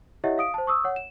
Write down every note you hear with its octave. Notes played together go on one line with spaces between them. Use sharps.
E4 G4 C#5 D#5 E5 F#5
F5 D#6 D7
C5 A5
C#6 D#6 E6
C#5 F#5
E7